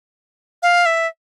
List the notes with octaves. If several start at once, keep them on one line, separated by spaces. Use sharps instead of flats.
F5
E5